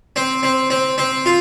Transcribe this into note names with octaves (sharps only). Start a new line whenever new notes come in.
C4
C4
C4
C4
F4